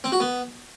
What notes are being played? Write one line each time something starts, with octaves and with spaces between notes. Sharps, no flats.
C4
F#4
B3